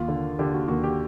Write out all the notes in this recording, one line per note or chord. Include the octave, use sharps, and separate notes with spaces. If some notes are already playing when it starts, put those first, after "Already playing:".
Already playing: D#2 F4
D3
D3 G4
F#4
D#2 F#4
G4